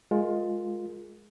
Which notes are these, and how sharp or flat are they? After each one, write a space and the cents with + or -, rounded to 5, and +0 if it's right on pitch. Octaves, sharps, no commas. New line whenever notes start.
G#3 +10 F4 +20 A#4 -5